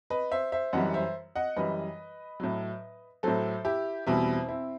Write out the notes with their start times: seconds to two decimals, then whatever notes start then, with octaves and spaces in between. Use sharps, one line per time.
0.10 B4 D#5
0.31 C5 E5
0.52 C5 E5
0.73 F#2 E3 G3 D#5 F#5
0.94 C5 E5
1.35 D#5 F#5
1.56 F#2 E3 G3 B4 D#5
2.40 A2 F#3
3.23 A2 F#3 A4 C5
3.65 E4 G4
4.07 E2 B2 G3 C4 E4
4.48 C4 E4